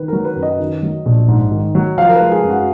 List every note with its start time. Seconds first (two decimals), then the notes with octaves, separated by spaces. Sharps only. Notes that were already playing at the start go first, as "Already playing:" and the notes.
Already playing: D#3 B4
0.08 F#3 A#4
0.25 B4
0.36 F#2
0.43 D#5
0.59 D#3
0.83 F#3
1.06 A#1
1.28 G#2
1.52 D#3
1.75 F#3
1.98 F3 F5
2.08 A#4
2.15 B4
2.20 G#3
2.32 G#4
2.44 F#2
2.49 F#4